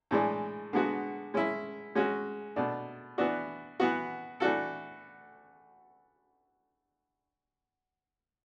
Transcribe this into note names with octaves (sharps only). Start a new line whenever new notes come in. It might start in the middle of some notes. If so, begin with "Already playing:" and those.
A2 E3 G#3 D4
D3 G#3 B3 F#4
G#3 C#4 E4
G#3 C#4 F#4
B2 A3 D4
E3 B3 D4 F#4
E3 B3 F#4
E3 A3 D4 F#4 A4